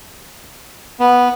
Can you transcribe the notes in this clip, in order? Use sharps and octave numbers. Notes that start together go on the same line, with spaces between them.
B3